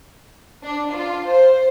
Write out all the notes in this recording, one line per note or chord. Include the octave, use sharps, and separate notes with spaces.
D4
F4
C5